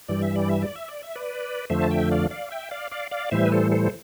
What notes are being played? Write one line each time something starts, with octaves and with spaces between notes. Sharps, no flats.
G2 E3 G3 D5
E5
D5
E5
D5
E5
D5
E5
B4 D5
F2 D3 F3 A3 C5 E5
A5
E5 G5
D5 F5
D5 F5
E5 G5
D5 F5
D5 F5
D5 F5
A2 E3 G3 C5 E5
B4
A4 C5
A4 C5